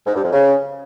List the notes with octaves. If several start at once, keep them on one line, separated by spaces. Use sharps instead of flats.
G#2
G2
F2
C#3